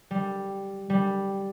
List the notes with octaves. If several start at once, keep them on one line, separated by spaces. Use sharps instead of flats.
G3
G3